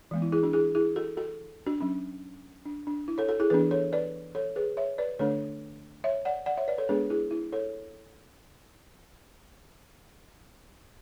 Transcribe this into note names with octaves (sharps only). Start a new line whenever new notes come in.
E3 G#3 B3
E4
E4 G#4
D4 F#4
E4 G#4
E4 G#4
F#4 A4
F#4 A4
D4 F#4
F#3 C#4
D4
D4
E4
A4 C#5
F#4 A4
E4 G#4
E3 B3 D4 G#4 B4
A4 C#5
B4 D5
A4 C#5
G#4 B4
C#5 E5
B4 D5
D3 A3 D4 A4 C#5
C#5 E5
D5 F#5
D5 F#5
C#5 E5
B4 D5
A4 C#5
G#3 B3 D4 G#4 B4
E4 G#4
E4
A4 C#5